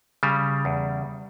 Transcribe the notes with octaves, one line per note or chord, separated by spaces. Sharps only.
C#3 G3
E2